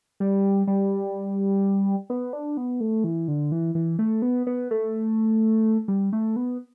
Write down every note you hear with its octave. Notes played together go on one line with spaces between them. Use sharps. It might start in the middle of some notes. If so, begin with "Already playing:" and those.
G3
G3
B3
D4
B3
A3
E3
D3
E3
E3
A3
B3
B3
A3
G3
A3
B3